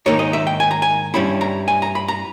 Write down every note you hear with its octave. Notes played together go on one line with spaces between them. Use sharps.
G#2 D#3 A#3 D#4 C#5
D#5
E5
G5
G#5
A#5
G#5
G2 G3 C#4 E4 B5
A#5
G#5
A#5
B5
A#5